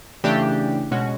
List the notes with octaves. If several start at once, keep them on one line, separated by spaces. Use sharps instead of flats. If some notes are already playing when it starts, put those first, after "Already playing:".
C#3 E3 A3 D4 G4
B2 G#3 C#4 F#4